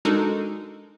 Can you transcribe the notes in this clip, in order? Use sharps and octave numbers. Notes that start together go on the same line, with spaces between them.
G#3 D4 D#4 F#4 A4 A#4